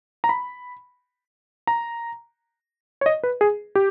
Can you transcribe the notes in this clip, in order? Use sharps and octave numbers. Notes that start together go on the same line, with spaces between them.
A#5
B5
A#5
C#5
D#5
B4
G#4
G4